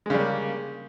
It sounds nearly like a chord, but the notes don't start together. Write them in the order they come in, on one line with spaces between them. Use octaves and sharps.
G#3 C#3 G3 A#3